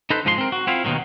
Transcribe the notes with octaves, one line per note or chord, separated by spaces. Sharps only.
D#4 A4 B4 C5
G#2 F3 G#3 A#4 C6
C4 A#4
F#4
C4 E4 F4 F5
D#2 G#2 B2 D#3 F#3